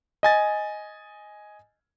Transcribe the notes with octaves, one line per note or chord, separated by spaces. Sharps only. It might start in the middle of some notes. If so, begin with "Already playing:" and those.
D#5 G#5 A6